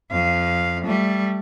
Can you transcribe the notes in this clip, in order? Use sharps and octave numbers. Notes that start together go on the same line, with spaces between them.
F2 F5
G3 A3